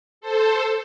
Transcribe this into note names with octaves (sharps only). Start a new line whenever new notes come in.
A4 C5